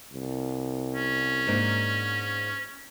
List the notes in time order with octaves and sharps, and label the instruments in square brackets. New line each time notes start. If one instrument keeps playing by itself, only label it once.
[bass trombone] C2
[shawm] C#4
[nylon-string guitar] G#2 A#3 D4